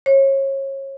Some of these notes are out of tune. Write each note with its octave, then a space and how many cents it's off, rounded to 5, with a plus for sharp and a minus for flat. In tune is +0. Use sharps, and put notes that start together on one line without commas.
C#5 -30